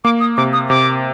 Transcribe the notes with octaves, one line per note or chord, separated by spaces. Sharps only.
A#3 D6
D#6
C3 D6
D#6
C3 D6